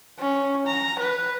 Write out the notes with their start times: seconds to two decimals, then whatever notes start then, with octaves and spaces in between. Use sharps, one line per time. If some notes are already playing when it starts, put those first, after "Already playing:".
0.19 C#4
0.67 A#5
0.99 B4